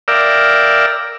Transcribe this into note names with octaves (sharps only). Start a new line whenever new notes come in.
A#4 D5 E5 F5 G5